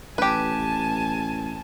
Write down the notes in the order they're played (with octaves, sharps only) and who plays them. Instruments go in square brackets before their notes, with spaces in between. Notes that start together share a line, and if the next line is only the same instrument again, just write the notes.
[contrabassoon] A1 [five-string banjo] G4 B4 [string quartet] G#5 A5